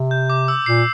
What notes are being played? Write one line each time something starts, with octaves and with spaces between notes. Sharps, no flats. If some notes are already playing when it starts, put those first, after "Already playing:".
Already playing: C3
G6
D6
E6
A#2 C7